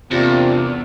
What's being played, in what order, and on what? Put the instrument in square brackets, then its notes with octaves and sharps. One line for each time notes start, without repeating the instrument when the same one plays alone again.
[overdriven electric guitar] E2 [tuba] C3 [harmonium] A#3 C4 D4 [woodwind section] F4